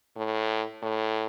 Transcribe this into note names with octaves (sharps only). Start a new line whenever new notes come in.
A2
A2